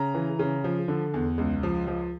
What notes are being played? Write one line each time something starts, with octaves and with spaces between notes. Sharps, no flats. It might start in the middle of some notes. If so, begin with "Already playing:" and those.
Already playing: C#3 A#5
E3
C#3
F3
D3
E2
C#2
F3
F3